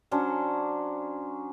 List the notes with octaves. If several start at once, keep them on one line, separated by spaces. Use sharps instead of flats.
F#3 C#4 D4 C5